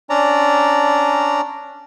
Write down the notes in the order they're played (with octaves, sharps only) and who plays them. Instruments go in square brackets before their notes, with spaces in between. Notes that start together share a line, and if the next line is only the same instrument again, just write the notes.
[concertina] C#4 D4 D5 A#5